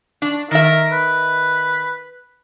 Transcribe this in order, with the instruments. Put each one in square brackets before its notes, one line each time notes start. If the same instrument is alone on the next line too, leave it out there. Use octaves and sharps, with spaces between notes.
[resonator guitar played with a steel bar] D4
[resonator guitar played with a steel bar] D#3 E5 [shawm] A#4
[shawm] B4